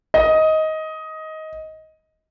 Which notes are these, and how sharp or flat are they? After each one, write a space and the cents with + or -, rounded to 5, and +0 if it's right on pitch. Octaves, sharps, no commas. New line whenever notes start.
D#5 +15